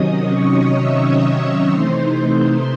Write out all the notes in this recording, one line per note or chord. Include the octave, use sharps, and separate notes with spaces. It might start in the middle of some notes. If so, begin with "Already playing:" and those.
Already playing: C3 D#3 F#3 C#4 D#5 D#6
C#5 C#6
E5 E6
D#5 D#6
C3 E3 A3 D#4 C5 C6
C5 C6